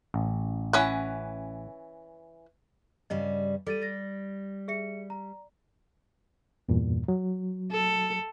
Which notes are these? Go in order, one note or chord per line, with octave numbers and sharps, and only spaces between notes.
A1
E3 C#4 F#5
G2 C#3 G3 D#5
G3 A4 A6 D#7
A6 A#6
G#4 E5 C#7
A#5
E2 G2 A#2
F#3
A4